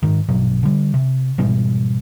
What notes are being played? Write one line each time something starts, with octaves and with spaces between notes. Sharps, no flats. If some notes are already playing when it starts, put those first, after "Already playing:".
G#2 D#3
A#1 G2 B2 F#3
D3 G3
C3
G#2 B2 E3 G3